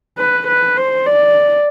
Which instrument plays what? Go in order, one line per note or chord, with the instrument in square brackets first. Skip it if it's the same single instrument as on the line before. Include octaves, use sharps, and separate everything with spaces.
[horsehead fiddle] B4
B4
C5
D5